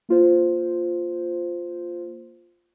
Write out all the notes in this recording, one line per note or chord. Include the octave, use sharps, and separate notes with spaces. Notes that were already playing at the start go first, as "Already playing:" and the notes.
A#3 F4 C5